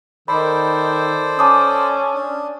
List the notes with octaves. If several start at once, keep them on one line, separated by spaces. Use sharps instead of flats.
D#3 A4 C5 D5 B5
C#4 A5 D6 D#6
D4